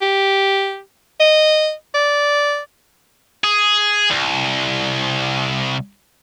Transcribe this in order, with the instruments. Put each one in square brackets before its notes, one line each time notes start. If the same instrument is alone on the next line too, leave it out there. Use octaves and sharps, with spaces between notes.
[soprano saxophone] G4
D#5
D5
[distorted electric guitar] G#4
C2